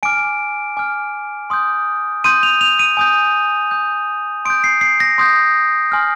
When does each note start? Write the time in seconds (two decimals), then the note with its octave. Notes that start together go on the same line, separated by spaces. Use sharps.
0.03 G#5 D6 F6 D7
0.77 G#5 D6 F6
1.50 C6 D#6 G6
2.24 C6 D#6 G6 D#7
2.43 F7
2.61 F7
2.79 D#7
2.97 G#5 D#6 G6
3.71 G#5 D#6 G6
4.45 C6 D#6 G6 D7
4.64 C7
4.81 C7
5.00 A#6
5.18 C6 D#6 G6
5.92 G#5 C6 F6